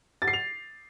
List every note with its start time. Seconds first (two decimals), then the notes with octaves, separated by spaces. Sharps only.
0.22 A6
0.28 C7
0.33 F7